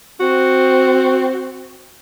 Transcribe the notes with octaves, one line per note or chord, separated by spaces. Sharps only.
C4 F#4